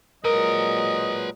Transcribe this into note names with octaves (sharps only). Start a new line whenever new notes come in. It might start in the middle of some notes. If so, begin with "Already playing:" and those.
A#2 F#3 G#3 A#4 B4 D#5 A#5